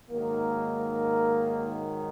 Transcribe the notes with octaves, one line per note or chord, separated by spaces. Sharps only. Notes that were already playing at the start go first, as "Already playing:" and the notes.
G#2 D#3 F#3 A#3